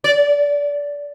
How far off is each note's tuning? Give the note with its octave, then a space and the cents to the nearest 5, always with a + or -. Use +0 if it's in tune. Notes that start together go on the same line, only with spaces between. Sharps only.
D5 -25